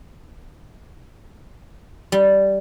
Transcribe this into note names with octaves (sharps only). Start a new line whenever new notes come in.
G3